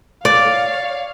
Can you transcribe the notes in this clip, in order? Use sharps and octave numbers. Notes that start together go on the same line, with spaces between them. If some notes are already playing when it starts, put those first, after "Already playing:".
C#5 D5 F5